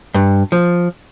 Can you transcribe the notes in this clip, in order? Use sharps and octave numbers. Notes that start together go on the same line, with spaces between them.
G2
F3